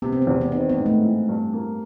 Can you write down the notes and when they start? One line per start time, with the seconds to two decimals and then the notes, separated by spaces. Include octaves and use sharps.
0.02 C3 B3
0.12 C4
0.22 B3
0.27 E2
0.41 B3
0.52 D#3 C4
0.69 B3
0.78 G#2
0.86 A3
1.04 E3
1.29 G2
1.54 A#3